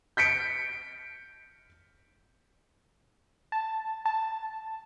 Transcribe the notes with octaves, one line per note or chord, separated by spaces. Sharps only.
G6 B6 C#7 D7
A5
A5